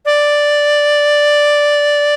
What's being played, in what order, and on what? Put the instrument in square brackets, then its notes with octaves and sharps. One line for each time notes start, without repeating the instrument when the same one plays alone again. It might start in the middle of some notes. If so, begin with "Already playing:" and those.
[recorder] D5